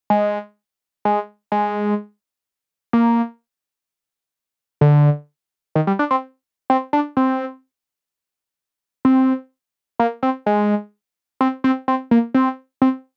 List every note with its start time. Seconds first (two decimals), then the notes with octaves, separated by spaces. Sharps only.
0.10 G#3
1.05 G#3
1.52 G#3
2.93 A#3
4.81 D3
5.75 D#3
5.87 G3
5.99 D4
6.11 C4
6.70 C4
6.93 D4
7.17 C4
9.05 C4
10.00 A#3
10.23 C4
10.46 G#3
11.41 C4
11.64 C4
11.88 C4
12.11 A#3
12.35 C4
12.82 C4